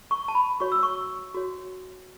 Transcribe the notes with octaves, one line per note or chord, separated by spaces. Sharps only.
C#6
A5
B5
F#4 C#5 C#6
E6
C#6
F#4 C#5